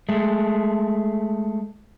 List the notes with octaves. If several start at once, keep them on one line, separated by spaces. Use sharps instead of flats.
G#3 A3